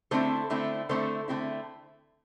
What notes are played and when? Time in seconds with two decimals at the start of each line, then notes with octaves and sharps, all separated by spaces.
0.11 D3 A3 C4 E4 A4 C5
0.50 D3 A3 C4 E4
0.89 D3 A3 C4 E4 A4 C5
1.28 D3 A3 C4 E4